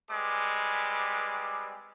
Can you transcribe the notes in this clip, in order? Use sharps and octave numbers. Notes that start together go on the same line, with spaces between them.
G3 G#3 C4 B4 D6